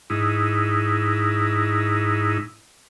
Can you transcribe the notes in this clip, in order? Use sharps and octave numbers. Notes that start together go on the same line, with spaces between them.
G#2 D#4 E4